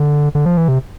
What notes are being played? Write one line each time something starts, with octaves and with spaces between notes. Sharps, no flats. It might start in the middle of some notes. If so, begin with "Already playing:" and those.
Already playing: D3
D3
F3
E3
C3